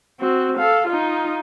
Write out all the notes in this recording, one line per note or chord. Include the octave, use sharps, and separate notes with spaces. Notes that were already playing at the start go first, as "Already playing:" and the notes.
C4 F#4
A4 F5
D#4 F4